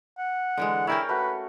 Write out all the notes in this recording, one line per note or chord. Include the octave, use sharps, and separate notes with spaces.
F#5
D3 E3 G#3
C#4 E4 A#4 C#5 F5 G5
A3 F#4 B4